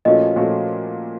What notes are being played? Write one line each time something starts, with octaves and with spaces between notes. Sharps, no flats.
A#2 F3 A3 C#4 F#4 D#5
A#2 F3 A3 C#4 F#4